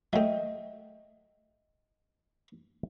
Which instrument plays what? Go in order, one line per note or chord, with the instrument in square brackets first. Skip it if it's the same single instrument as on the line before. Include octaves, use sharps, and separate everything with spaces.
[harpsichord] F#3 A3 [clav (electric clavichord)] D#5 E5 G5